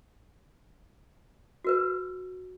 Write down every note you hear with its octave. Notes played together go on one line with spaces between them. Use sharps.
F#4 A#4 B4